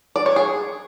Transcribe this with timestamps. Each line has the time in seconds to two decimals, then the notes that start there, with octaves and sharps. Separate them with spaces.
0.16 D5
0.26 C#5
0.36 G#4